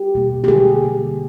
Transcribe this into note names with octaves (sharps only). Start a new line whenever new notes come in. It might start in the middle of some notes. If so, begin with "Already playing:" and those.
Already playing: G4
B2 G3 A#3
G4
D3 G3 A#3 G#4
D3 G3 A#3